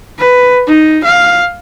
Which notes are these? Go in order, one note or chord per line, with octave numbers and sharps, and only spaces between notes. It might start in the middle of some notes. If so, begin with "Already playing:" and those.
B4
D#4
F5